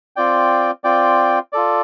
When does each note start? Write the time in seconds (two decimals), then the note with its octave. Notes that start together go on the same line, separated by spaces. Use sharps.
0.16 C4 F4 D5 G5
0.84 C4 F4 D5 G5
1.53 F4 A4 D5